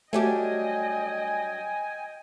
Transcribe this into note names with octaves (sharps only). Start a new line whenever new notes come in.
F#3 G3 A3 D4 G4 D#5 G5 G#5